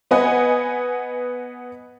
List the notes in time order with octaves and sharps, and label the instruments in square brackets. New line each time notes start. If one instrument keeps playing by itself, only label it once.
[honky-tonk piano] B3 B4 D#5 F#5 G#5